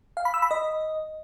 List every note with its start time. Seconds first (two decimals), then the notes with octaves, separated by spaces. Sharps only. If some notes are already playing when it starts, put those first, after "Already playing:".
0.17 F5
0.25 B5
0.34 E6
0.42 B5
0.51 D#5